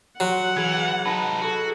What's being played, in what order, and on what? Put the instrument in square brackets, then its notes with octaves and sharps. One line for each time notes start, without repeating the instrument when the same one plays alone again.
[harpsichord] F#3 [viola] F#5 [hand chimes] C6 F#6 C7
[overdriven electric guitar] E3 [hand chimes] G#4 G#6
[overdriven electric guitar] D#4 B4 [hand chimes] A5 B5 A#6
[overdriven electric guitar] F#4 [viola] G#4 A4